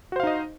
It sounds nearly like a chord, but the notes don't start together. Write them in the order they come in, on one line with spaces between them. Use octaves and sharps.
F#4 C5 F5 D#4 D#5